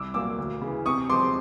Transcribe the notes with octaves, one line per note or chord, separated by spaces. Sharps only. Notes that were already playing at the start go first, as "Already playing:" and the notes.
Already playing: C2 D6 E6
A#2 F#3 A#3 D6 E6
D2
C#3 E3
C3 C#6 D#6
F3 G#3 C4 C6 D6